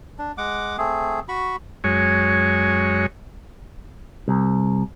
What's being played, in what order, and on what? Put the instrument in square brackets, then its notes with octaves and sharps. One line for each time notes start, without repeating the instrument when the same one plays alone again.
[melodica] D4
G#3 F#5 D6
A3 C4 G#4
F#4 B5 C#6
[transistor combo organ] F#2 G#3 C#5
[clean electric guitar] C2